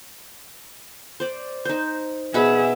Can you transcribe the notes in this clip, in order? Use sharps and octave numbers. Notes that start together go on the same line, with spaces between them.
C5 D5
D#4 C5
B2 G#4 E5 F#5 B5